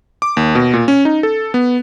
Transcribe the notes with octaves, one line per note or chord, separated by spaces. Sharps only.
D6
D#2
B2
A#2
C#4
D#4
A4
B3